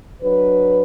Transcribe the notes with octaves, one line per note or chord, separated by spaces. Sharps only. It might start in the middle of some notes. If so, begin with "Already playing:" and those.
F#3 D4 B4